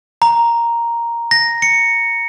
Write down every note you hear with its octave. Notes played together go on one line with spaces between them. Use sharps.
A#5
A#6
C#7